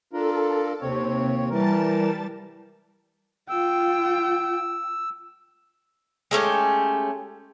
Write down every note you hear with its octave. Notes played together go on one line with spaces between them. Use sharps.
D4 F4 A4 A#4
D#2 C3 C4 C#5
E3 G3 A#4 A5 A6
F4 G5 E6
G#3 A3 C#4 G4